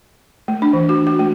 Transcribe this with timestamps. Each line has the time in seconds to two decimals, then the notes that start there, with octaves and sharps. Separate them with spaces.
0.48 A3
0.62 D4
0.73 E3
0.89 F#4
1.07 F#4
1.19 A3